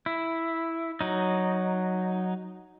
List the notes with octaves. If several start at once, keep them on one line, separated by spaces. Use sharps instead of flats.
E4
F#3 D#4